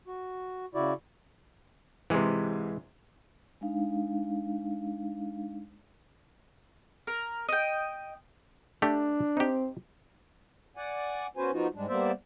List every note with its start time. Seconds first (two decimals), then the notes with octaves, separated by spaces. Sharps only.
0.08 F#4
0.75 C#3 E4 F#4 D5
2.10 G#2 C3 E3 G#3
3.61 G#3 D4 D#4 F5
7.07 A#4
7.49 D#5 G5
8.82 A3 D4 G4 D5
9.37 C4 D#4 G4
10.77 D5 F#5 G#5
11.37 B3 C#4 F#4 B4 C5 G#5
11.52 F3 B3 D#4 F4 F#4
11.75 G#2 G3 G#3 D4
11.88 G3 A#3 B3 C5 D5 E5